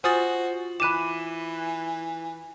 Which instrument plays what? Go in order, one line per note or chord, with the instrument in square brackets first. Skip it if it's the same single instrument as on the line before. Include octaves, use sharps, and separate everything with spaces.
[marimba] F4 [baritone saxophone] F#4 [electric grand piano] C5 [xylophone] G#5 D#6 A6
[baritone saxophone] E3 [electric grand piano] B5 D#7 E7 [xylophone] D6 F#6